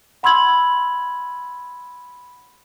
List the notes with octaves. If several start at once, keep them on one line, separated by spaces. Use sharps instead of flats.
F#5 B5 C6 E6 G#6 F#7